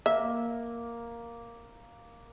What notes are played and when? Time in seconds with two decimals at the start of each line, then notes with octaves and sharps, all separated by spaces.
0.06 A#3 E5